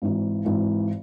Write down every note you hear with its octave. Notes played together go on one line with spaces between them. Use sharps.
G#1 G#2 E3
G#1 G#2 E3